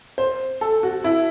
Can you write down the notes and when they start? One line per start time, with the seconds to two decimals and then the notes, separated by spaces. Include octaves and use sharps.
0.18 C5
0.61 A4
0.83 F#4
1.04 E4